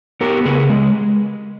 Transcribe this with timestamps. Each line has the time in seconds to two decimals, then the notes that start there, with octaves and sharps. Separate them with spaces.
0.21 B3 G4 A#4
0.45 C#3 G#4 B4
0.70 G#3